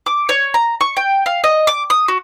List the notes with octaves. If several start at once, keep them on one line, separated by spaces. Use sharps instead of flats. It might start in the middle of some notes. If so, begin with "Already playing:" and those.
D6
C#5
A#5
C#6
G5
F5
D#5
D6
D#6
F#4